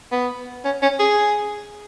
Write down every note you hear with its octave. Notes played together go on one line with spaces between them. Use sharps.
B3
C#4
C#4
G#4